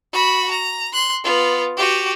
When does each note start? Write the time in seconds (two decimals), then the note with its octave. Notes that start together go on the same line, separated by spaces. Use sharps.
0.13 F#4 B5
0.51 A#5
0.93 C6 F#6
1.24 B3 F4
1.77 F#4 G4